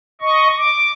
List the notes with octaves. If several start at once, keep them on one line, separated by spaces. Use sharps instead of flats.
D#5 C#6
D6